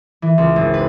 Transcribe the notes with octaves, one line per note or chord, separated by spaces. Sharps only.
E3
C#2
G#1
B4